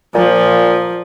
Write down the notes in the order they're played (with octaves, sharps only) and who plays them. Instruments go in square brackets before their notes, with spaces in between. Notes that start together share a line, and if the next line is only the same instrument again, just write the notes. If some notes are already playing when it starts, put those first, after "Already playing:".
[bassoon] A#2 [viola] F3